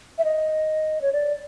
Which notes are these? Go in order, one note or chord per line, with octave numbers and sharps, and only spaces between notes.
E5
D#5
C#5
D5